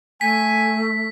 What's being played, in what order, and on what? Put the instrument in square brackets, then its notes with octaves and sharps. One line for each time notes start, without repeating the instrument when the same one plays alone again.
[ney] A3 [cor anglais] G#5 [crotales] B6